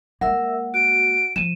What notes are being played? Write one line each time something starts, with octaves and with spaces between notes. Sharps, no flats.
G#3 A#3 A#4 E5 F#5 E6
F#4 D7
F3 D#7 E7